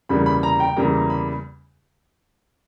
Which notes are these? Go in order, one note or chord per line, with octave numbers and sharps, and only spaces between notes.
E2 C#3 G3 A#3 B5
B5
A#5
G5
E2 C#3 G3 A#3 A#5
A#5
B5